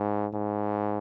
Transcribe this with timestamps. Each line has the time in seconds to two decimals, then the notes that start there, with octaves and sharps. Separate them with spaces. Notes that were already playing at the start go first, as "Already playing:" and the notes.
Already playing: G#2
0.34 G#2